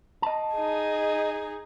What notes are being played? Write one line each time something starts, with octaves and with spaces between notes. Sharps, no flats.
D#5 A5
D#4 G#4